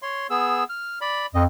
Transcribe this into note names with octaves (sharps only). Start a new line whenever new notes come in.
C#5 C6
B3 G#4 E6
F6
D5 B5
F2 D#5